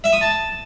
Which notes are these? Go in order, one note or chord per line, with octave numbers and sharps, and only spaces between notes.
E5
D#6
A5